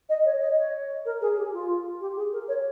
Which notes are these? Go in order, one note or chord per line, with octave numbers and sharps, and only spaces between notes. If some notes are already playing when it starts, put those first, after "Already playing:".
D#5
C#5
D#5
C#5
A#4
G#4
G4
F4
G4
G#4
A#4
C#5